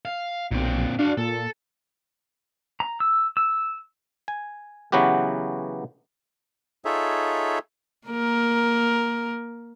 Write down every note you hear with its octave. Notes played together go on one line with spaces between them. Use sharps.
F5
B1 A#2 C4
D4 F#4 F5
A#2 A4
A#5
E6
E6
G#5
C#3 E3 F#3 B3 F#4 G4
D#4 F4 G#4 A4 C#5 E5
A#3 A#4